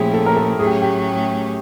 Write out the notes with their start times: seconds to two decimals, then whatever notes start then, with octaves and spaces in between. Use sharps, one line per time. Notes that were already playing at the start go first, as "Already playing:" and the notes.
Already playing: A#2 F3 A3 C#4 E4 G4 G#4
0.14 A4
0.26 A#4
0.36 A4
0.59 A2 F#3 A3 C#4 G#4
0.66 G4
0.81 G4